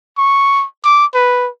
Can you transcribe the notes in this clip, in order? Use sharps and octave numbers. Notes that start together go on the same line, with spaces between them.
C#6
D6
B4